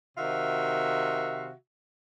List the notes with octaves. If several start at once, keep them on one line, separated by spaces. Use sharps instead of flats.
C3 D#3 F#4 E5 F5